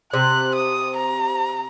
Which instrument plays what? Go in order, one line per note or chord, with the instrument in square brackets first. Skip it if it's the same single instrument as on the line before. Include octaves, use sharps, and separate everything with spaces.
[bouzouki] C3 [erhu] F#6
[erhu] D#6
A#5